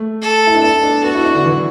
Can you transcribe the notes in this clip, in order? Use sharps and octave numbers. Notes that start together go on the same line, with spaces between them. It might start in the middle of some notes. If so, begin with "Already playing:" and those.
Already playing: A3
A4
E4
D4
B3 A4
D4
B3 F#4
E4
D4
D3
E3